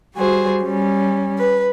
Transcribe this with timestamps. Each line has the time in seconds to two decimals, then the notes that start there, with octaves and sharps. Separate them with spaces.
0.15 G3 F#4 G#4 C5
0.63 G3 C#4
1.38 B4